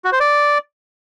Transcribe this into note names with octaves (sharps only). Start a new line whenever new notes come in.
F#4
C5
D5